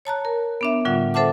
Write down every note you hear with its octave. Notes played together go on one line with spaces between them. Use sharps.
C#5 A5 A#5 F#6
A#4
B3 D4 E5
A2 D3 G3 F4 F#5
A4 C5 E5 F#5 A5 D6